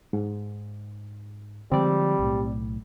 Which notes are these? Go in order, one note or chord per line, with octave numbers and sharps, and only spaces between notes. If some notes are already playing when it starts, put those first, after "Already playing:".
G#2
D3 F3 G3 G#3 C4 D5
B1 A2